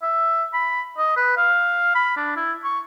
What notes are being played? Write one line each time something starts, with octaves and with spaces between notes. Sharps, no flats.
E5
B5
D#5
B4
F5
B5
D4
E4
C#6